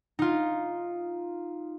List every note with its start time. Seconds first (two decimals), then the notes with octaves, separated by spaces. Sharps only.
0.19 D#4 F4